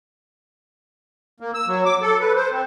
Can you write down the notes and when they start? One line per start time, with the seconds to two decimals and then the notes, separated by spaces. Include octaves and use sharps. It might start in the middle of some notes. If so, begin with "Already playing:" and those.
1.40 A#3
1.54 E6
1.67 F#3
1.85 D6
2.02 A4
2.19 B4
2.35 C5
2.53 C4